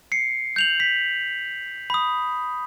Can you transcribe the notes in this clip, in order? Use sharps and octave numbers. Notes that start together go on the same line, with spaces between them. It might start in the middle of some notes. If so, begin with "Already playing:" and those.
C7 C#7
G6 F7 F#7
B6
B5 D#6